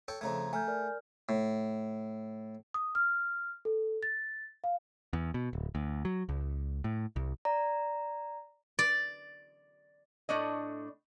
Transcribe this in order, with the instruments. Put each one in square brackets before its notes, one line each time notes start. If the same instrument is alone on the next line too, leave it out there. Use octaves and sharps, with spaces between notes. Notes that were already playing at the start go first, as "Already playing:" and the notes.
[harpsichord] A4 C#5 G5
[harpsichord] F2 C#3 A3 [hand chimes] A#5 G#6
[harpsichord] A3 [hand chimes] G#5 F6 G6
[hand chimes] A#4 D5 F6
[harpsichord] A2
[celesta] D#6
F6
A4
A6
F5
[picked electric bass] E2
B2
D1
D2
F#3
C#2
A2
C2
[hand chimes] D5 A#5
[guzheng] D5
[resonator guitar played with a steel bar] A2 A3 D4 D#5